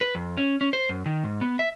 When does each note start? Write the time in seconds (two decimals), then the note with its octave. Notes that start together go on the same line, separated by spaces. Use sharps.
0.01 B4
0.15 F2
0.37 C#4
0.61 C#4
0.73 C5
0.89 F#2
1.06 D#3
1.24 G#2
1.41 B3
1.59 E5